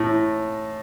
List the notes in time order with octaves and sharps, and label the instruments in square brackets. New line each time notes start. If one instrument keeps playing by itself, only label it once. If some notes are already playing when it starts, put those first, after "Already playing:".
Already playing: [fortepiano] A2